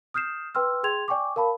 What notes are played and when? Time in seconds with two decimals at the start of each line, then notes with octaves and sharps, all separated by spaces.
0.14 D#6 F6 G6 C7 E7
0.55 B4 G5 C6 E6 F6
0.83 G#4 G5 C6 G#6 F7
1.08 D5 G5 G#5 C#6 D6
1.36 A#4 F5 A5 B5